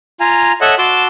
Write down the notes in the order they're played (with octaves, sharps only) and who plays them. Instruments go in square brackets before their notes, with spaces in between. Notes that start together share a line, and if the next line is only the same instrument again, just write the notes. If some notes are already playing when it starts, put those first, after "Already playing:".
[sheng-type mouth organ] F4 F5 G#5 A#5
A4 C#5 D#5 E5 F#5 C#6
F#4 A5 C6 D6 E6